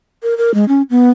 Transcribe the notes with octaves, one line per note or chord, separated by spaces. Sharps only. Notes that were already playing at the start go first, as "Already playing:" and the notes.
A#4
A#4
G#3
C#4
B3